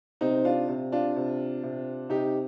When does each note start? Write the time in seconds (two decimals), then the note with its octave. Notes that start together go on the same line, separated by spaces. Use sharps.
0.21 C3 C4 D#4
0.45 D4 F4
0.68 C3
0.92 D4 F4
1.16 C3
1.63 C3
2.09 C3 D#4 G4